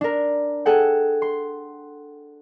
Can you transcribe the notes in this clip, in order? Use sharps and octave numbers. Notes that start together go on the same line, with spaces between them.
D4 A#4
G#4 A4 F#5 G5
C6